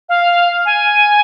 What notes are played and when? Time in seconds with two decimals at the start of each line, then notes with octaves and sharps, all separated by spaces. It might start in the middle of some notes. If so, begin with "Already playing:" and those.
0.09 F5
0.65 G#5